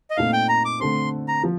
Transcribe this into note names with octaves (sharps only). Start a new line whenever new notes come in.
D#5
A#2 A3 C4 D#4 F5
G5
A#5
D6
D3 A3 C4 C6
A#5
F3